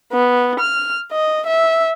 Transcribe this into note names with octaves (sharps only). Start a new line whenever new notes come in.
B3
F6
D#5
E5